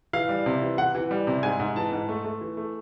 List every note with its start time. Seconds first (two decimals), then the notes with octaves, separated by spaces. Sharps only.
0.13 E3 F5
0.29 G3
0.46 C3
0.62 E3
0.78 E3 F#5
0.95 E3
1.11 G3
1.27 C3
1.43 G#2 G#5
1.60 G#2
1.76 E3 A5
1.92 G#2
2.09 A3
2.24 A3
2.41 E3
2.57 A3